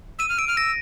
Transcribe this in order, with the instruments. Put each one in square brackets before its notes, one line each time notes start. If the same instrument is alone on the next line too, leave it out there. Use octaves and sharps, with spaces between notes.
[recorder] E6 [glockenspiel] D#7
[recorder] F6
[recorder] E6 [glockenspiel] D7
[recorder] F6
[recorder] E6 [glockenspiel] A#6